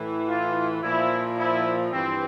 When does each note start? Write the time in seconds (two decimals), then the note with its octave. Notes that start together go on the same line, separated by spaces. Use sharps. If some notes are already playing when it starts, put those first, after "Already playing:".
Already playing: A2 E3
0.28 F4
0.83 A#2 F3 E4
1.37 E4
1.92 G2 E3 C4